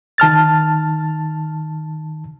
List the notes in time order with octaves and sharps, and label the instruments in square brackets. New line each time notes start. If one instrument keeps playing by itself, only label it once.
[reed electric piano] D#3 A5 F6 A6